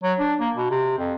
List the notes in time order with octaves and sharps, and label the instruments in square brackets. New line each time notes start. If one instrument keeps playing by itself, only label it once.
[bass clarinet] F#3
D4
A#3
B2
C3
F2